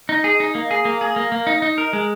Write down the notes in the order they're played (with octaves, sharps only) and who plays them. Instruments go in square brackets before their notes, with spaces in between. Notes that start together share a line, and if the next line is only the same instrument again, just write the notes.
[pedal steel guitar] D#4
G#4
D#4
A#3
G#4
A#3
G#4
A#3
A#3
D#4
D#4
A#4
G#3